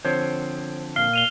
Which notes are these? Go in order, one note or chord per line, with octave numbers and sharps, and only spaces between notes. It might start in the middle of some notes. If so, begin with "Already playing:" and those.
D3 F3 C4 C5 C#5
A#2 F5 F6 G7
D#7 F7 G7